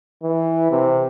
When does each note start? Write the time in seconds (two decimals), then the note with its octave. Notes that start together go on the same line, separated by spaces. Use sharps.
0.23 E3
0.71 C3